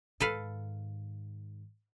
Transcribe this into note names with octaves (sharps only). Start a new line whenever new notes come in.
G#2 D#3 A4 B4 F5